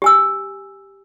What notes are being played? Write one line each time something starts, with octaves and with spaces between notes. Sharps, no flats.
G4 G#5 E6